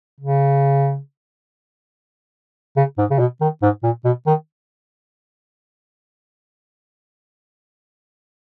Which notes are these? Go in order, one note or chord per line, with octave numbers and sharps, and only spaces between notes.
C#3
C#3
G#2
C#3
B2
D#3
G#2
A#2
B2
D#3